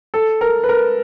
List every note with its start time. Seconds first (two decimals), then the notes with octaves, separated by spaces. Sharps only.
0.14 A4
0.41 A#4
0.64 B4
0.69 A#4